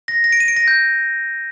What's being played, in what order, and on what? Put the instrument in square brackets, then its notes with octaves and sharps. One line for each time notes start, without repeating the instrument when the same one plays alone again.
[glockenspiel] A#6
A#6
D7
D#7
D7
A#6
G6